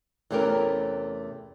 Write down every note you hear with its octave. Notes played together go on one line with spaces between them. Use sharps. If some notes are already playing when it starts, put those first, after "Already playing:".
E2 C3 A3 C#4 G4 A#4